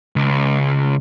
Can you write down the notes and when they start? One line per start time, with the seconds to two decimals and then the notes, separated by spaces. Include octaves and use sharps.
0.16 C#2